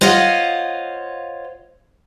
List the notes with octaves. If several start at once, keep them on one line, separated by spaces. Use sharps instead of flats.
F4 C5 C#5 D#5 F5 F#5